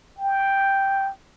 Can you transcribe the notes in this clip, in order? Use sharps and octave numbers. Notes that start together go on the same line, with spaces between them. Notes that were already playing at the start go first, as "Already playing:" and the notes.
G5